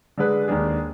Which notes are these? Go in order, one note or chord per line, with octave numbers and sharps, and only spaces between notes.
D3 G#3 D4 G#4 B4
D#2 D#3 G#3 D4 G#4